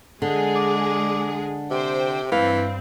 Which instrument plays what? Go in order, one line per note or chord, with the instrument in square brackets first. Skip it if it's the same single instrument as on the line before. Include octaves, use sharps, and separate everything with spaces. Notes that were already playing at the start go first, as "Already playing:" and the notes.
[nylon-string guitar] D3 [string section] G#3 G#4
[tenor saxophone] D5
[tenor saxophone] C3 [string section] C5 G5
[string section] G2 C4 [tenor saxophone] E3 [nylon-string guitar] B4 F5